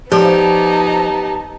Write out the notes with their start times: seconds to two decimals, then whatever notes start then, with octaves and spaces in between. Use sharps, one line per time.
0.12 F3 B3 D#4 G4 C#5 D5 A5